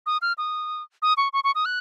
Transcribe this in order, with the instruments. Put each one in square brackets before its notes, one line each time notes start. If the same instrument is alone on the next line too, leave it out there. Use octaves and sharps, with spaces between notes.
[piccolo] D#6
F6
D#6
D#6
C#6
C#6
C#6
D#6
F#6